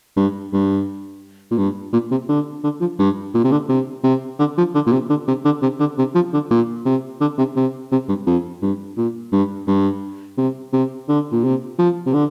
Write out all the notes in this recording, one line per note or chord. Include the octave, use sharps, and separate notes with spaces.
G2
G2
A#2
G2
A#2
C3
D3
D3
F3
G2
A#2
C3
D3
C3
C3
D3
F3
D3
A#2
C3
D3
C3
D3
C3
D3
C3
F3
D3
A#2
C3
D3
C3
C3
C3
G2
F2
G2
A#2
G2
G2
C3
C3
D3
A#2
C3
F3
C3
D3